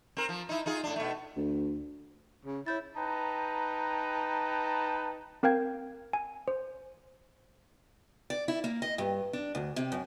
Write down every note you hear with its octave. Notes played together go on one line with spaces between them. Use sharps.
C4 A#4
F3
D#4 E4
D#4 F4 G#4
A2 D4
B2 A3
D2
C#3
E4 C#5 G6 A6
D#4 B4 G5 A5 A#5
C4 A#4 F5 G5 G#6
G#5
C5
D5
E4
A#3
D#5
G2
D4
D2
C3
F#2